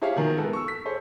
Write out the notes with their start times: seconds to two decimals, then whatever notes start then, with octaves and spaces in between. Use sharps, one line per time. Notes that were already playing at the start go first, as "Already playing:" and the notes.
0.02 E4 G4 G#4 C#5 E5 F5
0.16 B2 D#3 F3 A#4 G#5
0.36 G#3 B3 A4 A#4
0.53 C#6 E6
0.68 B6
0.85 G#4 A4 C5 C#5